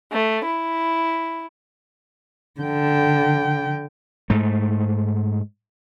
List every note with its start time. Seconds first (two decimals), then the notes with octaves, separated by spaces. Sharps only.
0.11 A3
0.46 E4
2.61 D3 G5
4.30 G#2 A3